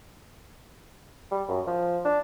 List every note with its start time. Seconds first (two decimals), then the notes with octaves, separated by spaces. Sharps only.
1.31 G3
1.48 F#2
1.67 F3
2.05 D4